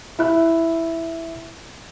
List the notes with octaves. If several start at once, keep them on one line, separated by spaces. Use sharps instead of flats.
E4 F#6